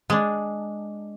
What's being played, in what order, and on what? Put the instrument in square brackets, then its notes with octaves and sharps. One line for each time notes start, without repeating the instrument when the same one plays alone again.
[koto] G#3 D4